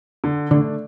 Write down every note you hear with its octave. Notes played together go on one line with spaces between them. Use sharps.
D3
D3 A3 D4